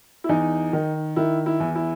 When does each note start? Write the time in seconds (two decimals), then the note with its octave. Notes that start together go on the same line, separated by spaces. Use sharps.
0.24 E4
0.29 E2 D#4
0.73 D#3
1.16 D#3 E4
1.46 E4
1.60 E2
1.75 E4